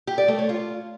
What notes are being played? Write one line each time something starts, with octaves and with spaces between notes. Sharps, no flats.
G4
D5
A3
C#5
F4